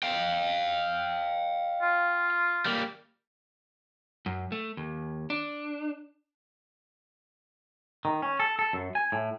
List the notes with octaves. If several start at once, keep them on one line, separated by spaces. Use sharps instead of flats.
F5 G5
F4
G3 A#3
F#2
A3
D#2
D4
D#3
C#4
A4
A4
F#2
G#5
A2